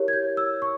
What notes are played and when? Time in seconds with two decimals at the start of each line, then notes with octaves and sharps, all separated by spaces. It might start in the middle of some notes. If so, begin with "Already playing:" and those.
Already playing: E4 G4 A#4 C#5
0.08 G#6
0.13 G6
0.37 E6
0.62 C#6